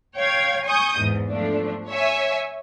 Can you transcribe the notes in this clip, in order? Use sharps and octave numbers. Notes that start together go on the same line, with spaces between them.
C#5 F5 G5 G#6
G#5 C#6 D#6 G6
E2 G#2
F3 A3 D4
C#5 E5 G#5